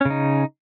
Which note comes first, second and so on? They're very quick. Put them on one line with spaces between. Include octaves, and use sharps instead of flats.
C#4 C#3 D#4